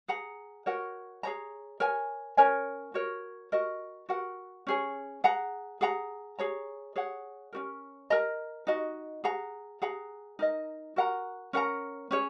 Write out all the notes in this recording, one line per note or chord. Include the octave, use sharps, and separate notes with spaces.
G#4 F#5 A#5
F#4 A#4 C#5 F#5
G#4 C#5 A#5
A#4 C#5 G#5
C#4 A#4 C#5 G#5
F#4 A#4 C#5
F#4 A#4 D#5
F#4 A#4 F#5
C#4 G#4 C#5
G#4 F#5 A#5
G#4 F#5 A#5
G#4 C#5 A#5
G#4 C#5 F#5
C#4 F#4 A#4
A#4 D#5 A#5
D#4 F#4 D#5
G#4 F#5 A#5
G#4 F#5 A#5
D#4 A#4 D#5
F#4 A#4 F#5 A#5
C#4 A#4 F#5 A#5
C#4 G#4 C#5